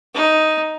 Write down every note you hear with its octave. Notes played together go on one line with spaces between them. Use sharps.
D#4